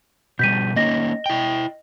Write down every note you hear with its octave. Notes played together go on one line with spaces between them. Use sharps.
B2 G3 G6 B6 D#7
A#3 C#4 D#4 D#5 A#6
E4 G5